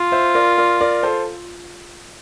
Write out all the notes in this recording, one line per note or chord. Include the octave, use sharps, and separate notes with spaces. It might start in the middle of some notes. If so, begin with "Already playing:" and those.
Already playing: F4
C5 E5
A#4 D5
A#4 D5
A#4 D5
A4 C5